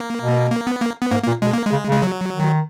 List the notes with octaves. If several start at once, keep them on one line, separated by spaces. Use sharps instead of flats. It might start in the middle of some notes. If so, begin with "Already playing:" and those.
Already playing: A#3
B2
A#3
B3
A#3
B3
G#2 A#3
A#2 A#3
B2 G#3
A#3
G#3
C#3
C#3
G#3
F#3
D#3